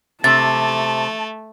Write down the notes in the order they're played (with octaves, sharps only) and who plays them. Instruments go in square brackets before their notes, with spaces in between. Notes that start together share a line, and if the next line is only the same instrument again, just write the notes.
[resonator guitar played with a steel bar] C3 [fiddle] A3 [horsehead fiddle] A5 [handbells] A6